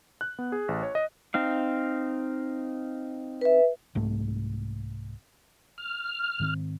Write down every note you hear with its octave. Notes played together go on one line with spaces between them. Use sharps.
F#6
B3
G#4
A1
C#5
D#5
C4 D#4 F5
B4 E5
C2 G#2 A3
F6
G#2 D#3 C4